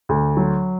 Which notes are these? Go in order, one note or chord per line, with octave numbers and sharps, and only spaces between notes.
D2
F#3